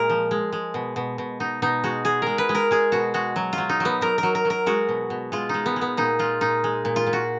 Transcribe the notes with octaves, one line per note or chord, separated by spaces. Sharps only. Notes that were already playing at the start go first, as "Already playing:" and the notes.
Already playing: A#2 G#3 A#4
F3
G#3
G#3
B2
B2
B2
B2 D#4
B2 D#4
G#3 F#4
G#3 G#4
G#3 A#4
B4
G#3
A#4
G#3 G#4
B2 F#4
G#3 F#4
F#3
F4
F#3
D#4
F#3 B3
F#3 A#4
A#4
F#3
A#4
F#3
A#4
G#3 F#4
B2
B2
G#3 F4
G#3 D#4
B3
G#3
B3
A#2 D#4
G#3 F4
A#2 D#4
G#3
A#2
F4
A#2
F#4